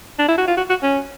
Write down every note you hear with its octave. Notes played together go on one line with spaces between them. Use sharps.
D4
E4
F#4
F4
F#4
F#4
C#4